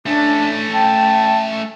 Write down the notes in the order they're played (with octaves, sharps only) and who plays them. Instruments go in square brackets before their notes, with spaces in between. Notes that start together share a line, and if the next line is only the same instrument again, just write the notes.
[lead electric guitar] A3 C#4 [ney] D4
[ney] G5 [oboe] A5